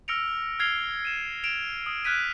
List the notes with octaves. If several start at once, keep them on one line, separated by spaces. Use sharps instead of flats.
E6 F6 A#6 C#7 D7 F7
E6 F6 G#6 C7 F7 G7
D#7 E7
D7 E7 F7
D#6
F6 F#6 G#6 B6 D#7 E7